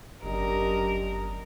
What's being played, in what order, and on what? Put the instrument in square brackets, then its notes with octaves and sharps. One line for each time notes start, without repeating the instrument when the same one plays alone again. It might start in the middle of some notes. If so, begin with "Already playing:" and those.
[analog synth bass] G1 [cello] F#2 [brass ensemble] D4 G4 D#5 [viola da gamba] A#4